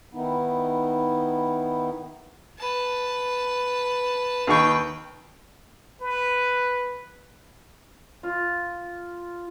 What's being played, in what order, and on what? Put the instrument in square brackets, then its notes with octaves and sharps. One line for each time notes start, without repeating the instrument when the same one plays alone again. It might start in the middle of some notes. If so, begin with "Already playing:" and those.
[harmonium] D#3 B3 D#4 E4
[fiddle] B4 A5
[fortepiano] D#2 D#3 C#6 [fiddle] B4 G5
[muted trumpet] B4
[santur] F4